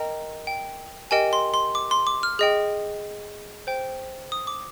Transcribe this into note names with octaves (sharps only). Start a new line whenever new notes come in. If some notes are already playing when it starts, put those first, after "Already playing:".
Already playing: A#4 D#5 G5 A#5
G5
G4 A#4 D#5 G5 G#5
C6
C6
D6
C6
D6
F6
G#4 D#5 G5
C5 G5
D#6
D6